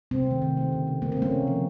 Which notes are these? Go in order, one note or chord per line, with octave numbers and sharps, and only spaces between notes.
C3 C4
D#3 A3
C3
D#3 A3
C#3
A3
C#3 A#3
C4
A3
A#3 C#4
C3
F3 A#3